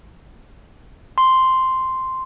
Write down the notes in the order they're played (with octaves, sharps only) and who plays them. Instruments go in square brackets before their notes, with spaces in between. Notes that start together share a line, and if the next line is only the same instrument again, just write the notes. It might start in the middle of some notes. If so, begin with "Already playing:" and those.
[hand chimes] C6